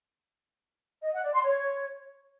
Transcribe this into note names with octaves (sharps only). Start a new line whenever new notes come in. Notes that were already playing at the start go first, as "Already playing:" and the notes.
D#5
F#5
D5
C6
C#5